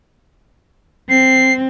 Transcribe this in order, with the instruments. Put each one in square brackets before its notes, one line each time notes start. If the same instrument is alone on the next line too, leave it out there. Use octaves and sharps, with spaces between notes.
[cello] C4 [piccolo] C7